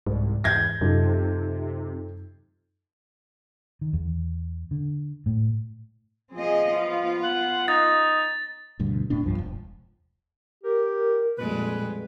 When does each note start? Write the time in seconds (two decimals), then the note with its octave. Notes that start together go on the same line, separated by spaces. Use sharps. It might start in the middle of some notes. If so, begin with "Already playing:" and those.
0.07 C2 G#2
0.44 E2 G6 G#6 A#6
0.81 F#2 C3 D#4 F4 A4
3.81 D#3
3.93 E2
4.71 D3
5.26 A2
6.34 F3 C4 G#4 D#5
6.72 B3 F4
7.23 F#5
7.68 D#4 A6
8.79 D2 G2 B2 D3
9.10 E1 A2 B3 D4
9.23 C2 G2 F3
9.39 E1
10.64 G4 A#4
11.38 F2 A#2 G3 G#3 B4